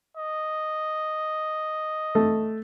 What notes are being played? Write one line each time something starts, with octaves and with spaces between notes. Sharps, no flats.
D#5
A3